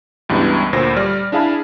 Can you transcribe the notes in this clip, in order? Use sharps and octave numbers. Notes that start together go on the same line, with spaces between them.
C#2 G2 E3 G3 B3
D2 A#2 C5 B5 A#6
G3 D5 F6
D4 E4 G#4 F5 A5 B5